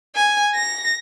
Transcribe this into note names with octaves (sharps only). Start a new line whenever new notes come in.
G#5
A#6